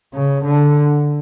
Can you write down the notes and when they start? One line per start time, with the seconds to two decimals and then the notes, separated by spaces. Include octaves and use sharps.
0.14 C#3
0.44 D3